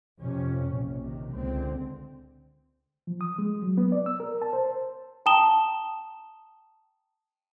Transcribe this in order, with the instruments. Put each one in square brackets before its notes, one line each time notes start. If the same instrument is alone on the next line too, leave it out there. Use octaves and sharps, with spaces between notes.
[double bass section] F2 C3 C#4
A#1
C3 D#3
C#2 D3 C4
[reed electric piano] F3
D#6
G#3
F#3
B3
D5
E6
A#4
A5
C5
[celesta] G5 A5 A#5 D#6 E7 G7